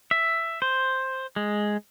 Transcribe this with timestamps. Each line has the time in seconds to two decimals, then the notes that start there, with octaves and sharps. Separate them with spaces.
0.11 E5
0.62 C5
1.36 G#3